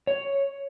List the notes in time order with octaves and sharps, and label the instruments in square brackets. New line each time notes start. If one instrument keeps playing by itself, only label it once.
[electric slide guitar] C#5